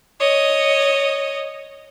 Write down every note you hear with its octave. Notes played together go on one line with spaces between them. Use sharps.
C#5 D#5